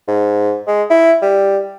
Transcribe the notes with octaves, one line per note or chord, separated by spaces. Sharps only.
G#2
G#3
E4
G3